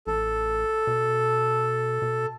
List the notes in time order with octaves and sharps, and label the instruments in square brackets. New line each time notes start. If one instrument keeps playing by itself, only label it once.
[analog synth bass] A1 [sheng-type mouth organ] A4
[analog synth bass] B2
B2